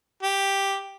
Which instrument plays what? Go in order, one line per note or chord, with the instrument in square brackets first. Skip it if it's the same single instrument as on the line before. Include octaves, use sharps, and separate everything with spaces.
[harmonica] G4